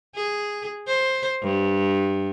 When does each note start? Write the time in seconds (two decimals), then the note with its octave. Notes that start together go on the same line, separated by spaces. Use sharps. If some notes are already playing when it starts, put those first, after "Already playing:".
0.16 G#4
0.87 C5
1.43 G2